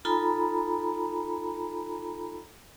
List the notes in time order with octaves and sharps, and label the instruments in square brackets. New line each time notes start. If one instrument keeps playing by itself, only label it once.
[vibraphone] D#4 F4 A4 G#5 A#5 B5